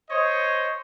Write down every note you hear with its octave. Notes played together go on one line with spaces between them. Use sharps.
C5 C#5 D#5